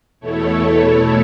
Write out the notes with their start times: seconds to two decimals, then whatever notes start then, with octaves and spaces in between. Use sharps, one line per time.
0.20 E2 B2 A3 E4 A4 C#5